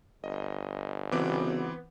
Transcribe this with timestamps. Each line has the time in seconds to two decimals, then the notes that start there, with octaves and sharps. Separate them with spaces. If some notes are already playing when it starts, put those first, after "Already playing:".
0.24 G1 D#5
1.12 C#3 E3 B3 C4 F#4 D6